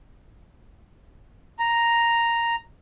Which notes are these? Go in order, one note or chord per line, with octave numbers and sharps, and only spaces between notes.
A#5